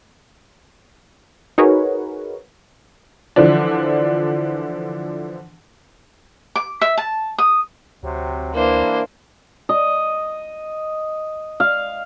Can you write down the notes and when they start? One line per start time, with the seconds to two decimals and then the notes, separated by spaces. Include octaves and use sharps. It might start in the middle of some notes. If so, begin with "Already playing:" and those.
1.58 D#4 F#4 G#4 A#4 B4 C#5
3.36 D3 E3 F3 D4
6.56 D6
6.81 E5
6.97 A5
7.38 D#6
8.03 D2 C3 F#3 C4
8.54 E3 A#3 D4 C5
9.69 D#5
11.60 F5